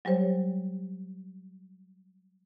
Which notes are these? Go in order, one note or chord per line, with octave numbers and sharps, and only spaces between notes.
F#3 G3 G4 C5 C#5